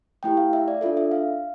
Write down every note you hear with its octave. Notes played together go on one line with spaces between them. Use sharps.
A3 E4 G4 G5
F5
E5
D5
D4 F4 A4 E5
E5
F5